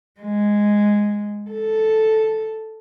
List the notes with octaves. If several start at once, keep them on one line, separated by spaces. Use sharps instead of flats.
G#3
A4